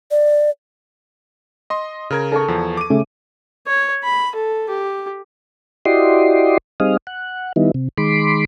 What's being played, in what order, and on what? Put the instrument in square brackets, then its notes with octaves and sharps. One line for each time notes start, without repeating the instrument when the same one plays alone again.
[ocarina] D5
[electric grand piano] D#5 C6
C#3 A#4 G#6
[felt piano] A4 A5 C#6
[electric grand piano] E2 F3
D6 D#7
[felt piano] C#3 A3
[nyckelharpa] C#5
B5
A4
G4
[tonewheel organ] E4 F#4 G4 D5 D#5 C6
G3 C4 D#4 G#4 D#5 F5
F#5
D#3 G3 B3 D#4 E4
C3
D#3 G#3 B5 C6 D6